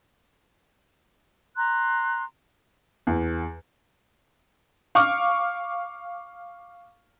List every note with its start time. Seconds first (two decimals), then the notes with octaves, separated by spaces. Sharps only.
1.56 A#5 C6 F#6
3.07 E2
4.95 F5 C#6 D6 F6